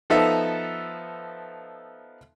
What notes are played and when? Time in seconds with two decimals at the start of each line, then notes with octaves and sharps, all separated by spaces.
0.10 F3 B3 D#4 A4 E5